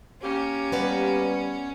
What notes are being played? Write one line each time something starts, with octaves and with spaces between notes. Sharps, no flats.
A#3 C#4 G4
G3 B3 B4 D5